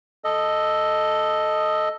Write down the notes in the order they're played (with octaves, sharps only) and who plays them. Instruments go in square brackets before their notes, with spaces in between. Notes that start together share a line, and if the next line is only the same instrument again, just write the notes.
[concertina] A4 D#5